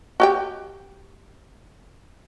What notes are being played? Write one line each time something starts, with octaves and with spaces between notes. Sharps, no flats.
F#4 G4 G5